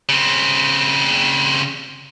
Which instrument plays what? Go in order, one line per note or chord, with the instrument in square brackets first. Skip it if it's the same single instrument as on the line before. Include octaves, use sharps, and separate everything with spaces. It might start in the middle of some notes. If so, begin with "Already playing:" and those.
[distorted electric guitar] C#3 C4